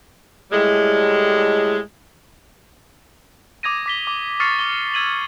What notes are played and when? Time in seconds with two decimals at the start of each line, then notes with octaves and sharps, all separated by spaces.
0.52 A2 G3 G#3
3.63 D6 D#6 G#6 A#6 D#7
3.86 D6 B6 G7
4.07 D6
4.40 C#6 D#6 F6 A6 C7 C#7
4.59 D6 G7
4.94 E6 G#6 D#7 F#7